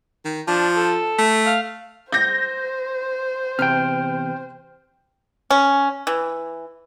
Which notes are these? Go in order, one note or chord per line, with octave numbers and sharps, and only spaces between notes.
D#3
F3 D4
A4
A3
F5
C5 G6 A#6
E2 C3 G5 F6
C#4
E3